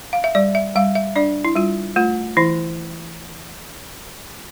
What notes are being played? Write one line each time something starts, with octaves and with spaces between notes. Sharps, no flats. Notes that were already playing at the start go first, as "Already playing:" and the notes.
F5
E5
G3 D5
E5
G3 F5
E5
D4 D5
E4
G3 F4
A3 F4
E3 E4